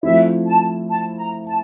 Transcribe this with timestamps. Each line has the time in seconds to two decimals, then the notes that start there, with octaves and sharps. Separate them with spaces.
0.03 F3 A3 C4 E4 E5
0.46 A5
0.90 A5
1.18 A#5
1.47 A5